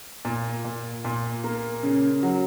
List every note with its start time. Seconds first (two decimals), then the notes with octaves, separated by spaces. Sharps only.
0.25 A#2
0.65 A#2
1.05 A#2
1.44 A#3
1.83 C#3
2.23 F#3